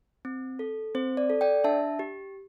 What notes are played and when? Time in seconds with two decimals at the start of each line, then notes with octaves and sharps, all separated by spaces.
0.25 C4
0.59 A4
0.95 C4 C5
1.17 D5
1.30 A4
1.41 D5 G5
1.64 D4 E5 A5
1.99 G4